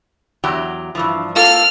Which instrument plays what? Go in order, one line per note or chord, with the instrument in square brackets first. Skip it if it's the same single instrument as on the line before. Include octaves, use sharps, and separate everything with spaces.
[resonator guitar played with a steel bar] E2 F#3 G4
G2 E3 F3
[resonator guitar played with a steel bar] A#3 F4 A4 [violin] F6